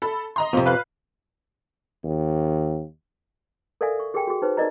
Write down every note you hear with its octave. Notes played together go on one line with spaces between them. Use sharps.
A4 B5
D#5 A#5 C6
F2 C3
B4 F5 F#6
D#2
A4 A#4 D5 E5 F5 G#5
C#6
G4 G#4 A#4 E5 G5 G#5
F#4 G#4
D#4 B4 C5
D#4 A#4 D5 D#5 A#5